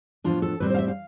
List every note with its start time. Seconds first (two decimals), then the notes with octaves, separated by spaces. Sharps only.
0.24 A2 F3 B3 D4 F4
0.42 A4
0.60 A2 G3 C4 B4
0.70 C5
0.74 F5
0.79 E5
0.88 F5